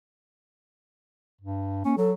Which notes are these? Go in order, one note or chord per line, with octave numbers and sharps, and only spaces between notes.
G2
A#3 C#4
F#3 A4